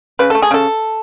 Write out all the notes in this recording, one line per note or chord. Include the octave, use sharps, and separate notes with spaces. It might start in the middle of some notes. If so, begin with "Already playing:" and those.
C#3 B4
A3 A4
G#4
C#3 A4